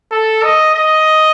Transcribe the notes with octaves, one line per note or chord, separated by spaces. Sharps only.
A4
D#5
D#5